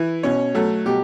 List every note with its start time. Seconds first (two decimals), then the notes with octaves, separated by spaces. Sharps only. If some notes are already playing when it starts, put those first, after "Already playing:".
Already playing: E3 E4
0.23 B2 C#4 C#5
0.55 F#3 A3 A4
0.86 B2 G3 G4